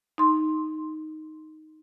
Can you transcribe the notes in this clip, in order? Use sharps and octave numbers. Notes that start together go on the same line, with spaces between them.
D#4 C6